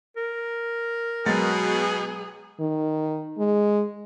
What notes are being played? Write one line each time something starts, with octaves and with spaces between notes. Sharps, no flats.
A#4
B2 F#3 G#3 G#4 A6
D#3
G#3